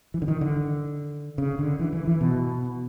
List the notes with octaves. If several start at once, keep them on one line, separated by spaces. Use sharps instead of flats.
E3
D3
D#3
D3
C#3
D3
E3
E3
E3
B2